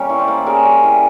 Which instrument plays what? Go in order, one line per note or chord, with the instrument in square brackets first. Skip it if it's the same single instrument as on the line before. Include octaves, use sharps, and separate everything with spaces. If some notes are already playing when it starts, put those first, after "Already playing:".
Already playing: [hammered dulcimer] G3 A#3 C#4 C#5
E3
C5 D5
A#3
C#4 G#4 A#4
G3
E3